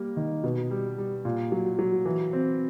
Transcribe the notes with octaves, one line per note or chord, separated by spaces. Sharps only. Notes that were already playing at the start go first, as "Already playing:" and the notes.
Already playing: G3 A#3
D#3
B2
G3
G3
A#2
F#3
F#3
E3
C4